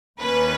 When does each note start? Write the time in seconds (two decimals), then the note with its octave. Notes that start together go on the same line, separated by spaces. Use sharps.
0.21 D#2 D#3 A#3 C#4 B4